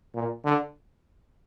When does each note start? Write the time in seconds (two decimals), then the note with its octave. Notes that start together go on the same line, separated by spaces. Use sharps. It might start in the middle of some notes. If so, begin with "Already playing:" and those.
0.15 A#2
0.45 D3